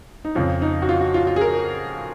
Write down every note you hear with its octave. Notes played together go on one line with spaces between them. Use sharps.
D#4
F2 C#3 F3 F4
D#4
F#4
F4
F#4
F4
F4
G#4
A#4